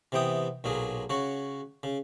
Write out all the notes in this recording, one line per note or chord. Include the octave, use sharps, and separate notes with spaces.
C3 E3 B3 G5 D#6
B1 A#2 F#3 G#4
C#3 F#4 C#5
C#3